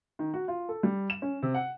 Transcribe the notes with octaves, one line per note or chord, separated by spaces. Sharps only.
D#3
F#4
F4
A4
G3
E7
C#4
C3
F#5